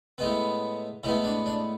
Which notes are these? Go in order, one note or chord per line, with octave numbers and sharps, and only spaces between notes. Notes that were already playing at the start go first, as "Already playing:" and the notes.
A2 G#3 B3
A2 G#3 B3 E4
D4
D4